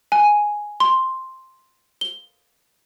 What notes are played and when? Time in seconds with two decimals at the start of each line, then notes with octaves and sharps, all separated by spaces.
0.12 G#5
0.80 C6
2.01 G7